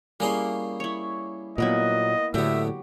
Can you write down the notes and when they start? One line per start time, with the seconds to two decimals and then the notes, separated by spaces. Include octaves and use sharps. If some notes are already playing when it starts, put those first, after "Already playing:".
0.20 G3 A#3 C#4 E4 G#4 C6
0.80 E4 C#5
1.58 A#2 F#3 A#3 B3 E4 D#5
2.34 A2 D3 F#3 B3 G4 E5